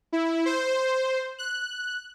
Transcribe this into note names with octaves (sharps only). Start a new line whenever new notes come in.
E4
C5
F#6